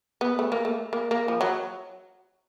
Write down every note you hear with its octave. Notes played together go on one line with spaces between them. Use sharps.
B3
A3
A#3
A3
A#3
A#3
F3
F#3